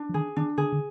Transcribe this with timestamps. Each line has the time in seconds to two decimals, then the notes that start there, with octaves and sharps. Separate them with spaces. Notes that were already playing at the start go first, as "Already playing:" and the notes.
Already playing: D4
0.09 F3
0.14 D#3 G#4
0.36 D#3 D4
0.58 D3 G#4
0.72 D3